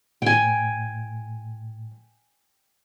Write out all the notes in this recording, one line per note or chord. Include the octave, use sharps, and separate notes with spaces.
A2 G5 G#5